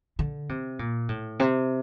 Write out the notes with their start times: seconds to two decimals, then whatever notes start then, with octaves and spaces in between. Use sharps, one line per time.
0.19 D3
0.49 C3
0.79 A#2
1.09 A2
1.39 C3